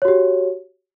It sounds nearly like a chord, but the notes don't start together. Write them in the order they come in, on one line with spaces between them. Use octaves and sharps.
C#5 F#4 G4